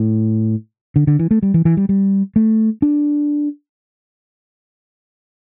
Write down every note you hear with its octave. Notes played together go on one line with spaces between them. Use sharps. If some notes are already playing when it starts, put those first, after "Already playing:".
Already playing: A2
D3
D3
E3
A3
G3
E3
E3
G3
G3
A3
D4